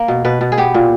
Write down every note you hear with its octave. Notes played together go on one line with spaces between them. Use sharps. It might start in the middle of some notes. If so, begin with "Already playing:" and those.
Already playing: A#3 A#4
B2
B2 B4
B2
G#4
B3 G4
A#2